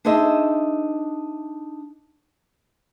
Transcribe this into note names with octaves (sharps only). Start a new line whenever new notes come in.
D4 D#4 G#4 C5 D#5 E5